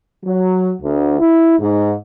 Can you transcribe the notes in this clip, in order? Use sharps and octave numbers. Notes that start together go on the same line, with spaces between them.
F#3
D2
E4
G#2